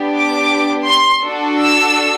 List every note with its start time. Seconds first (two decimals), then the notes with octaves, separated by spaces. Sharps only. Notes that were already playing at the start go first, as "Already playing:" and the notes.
Already playing: B3 D4 G4
0.18 D6
0.88 C6
1.24 D4 F#4 A4
1.60 E6